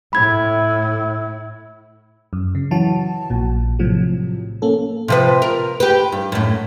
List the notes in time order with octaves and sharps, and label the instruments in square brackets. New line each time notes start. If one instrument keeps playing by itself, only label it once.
[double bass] A2 E4 [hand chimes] B5 G#6
[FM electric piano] F#2
C#3
E3 F#3 F#4 A5
A#1 A#2
A2 C3 F3 F#3
A#3 C#4 A4
[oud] C3 F3 B4
A#4
G4 B4
G2
F#2 A2